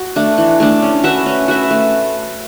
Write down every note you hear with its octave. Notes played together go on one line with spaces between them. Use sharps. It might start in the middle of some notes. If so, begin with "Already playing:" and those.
Already playing: F#4
A3 D4
E3
A3 D4
C#4
F#4 B4 E5
C#4
F#4 B4 E5
A3